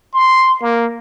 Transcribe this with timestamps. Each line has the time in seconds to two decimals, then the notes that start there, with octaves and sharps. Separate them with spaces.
0.13 C6
0.61 A#3